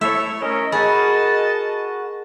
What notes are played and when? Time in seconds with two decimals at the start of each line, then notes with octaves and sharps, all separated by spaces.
0.01 A3 E4 A4 C#5 E5
0.42 C#4 A#4 C#5 D#5
0.72 F#4 G#4 A#4 D#5 A5 B5